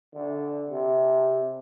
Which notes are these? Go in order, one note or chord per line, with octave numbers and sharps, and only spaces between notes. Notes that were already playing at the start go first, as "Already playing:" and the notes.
D3
C3